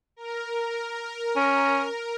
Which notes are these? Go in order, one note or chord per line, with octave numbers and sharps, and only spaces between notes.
A#4
C#4